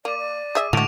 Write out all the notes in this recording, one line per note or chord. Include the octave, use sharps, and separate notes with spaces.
A#3 D5 D6 D#7
D5
G#4 E5
A2 D3 G#3 A3 F#4 D6 D7 F7